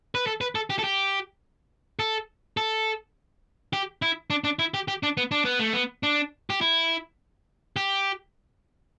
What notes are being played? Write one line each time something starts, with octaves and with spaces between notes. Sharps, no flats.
B4
A4
B4
A4
G4
A4
G4
A4
A4
G4
E4
D4
D4
E4
G4
G4
D4
B3
D4
B3
A3
B3
D4
G4
E4
G4